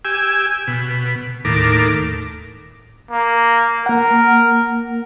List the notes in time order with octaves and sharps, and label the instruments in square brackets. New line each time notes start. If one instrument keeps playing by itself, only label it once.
[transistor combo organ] G4 G#5 E6
B2
D#2 A2 A#4 D6
[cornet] A#3
[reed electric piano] A#3 F#5 [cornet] A#4